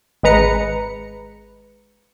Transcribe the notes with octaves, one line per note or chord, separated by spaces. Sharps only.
G#1 G#3 B4 A#5 C#7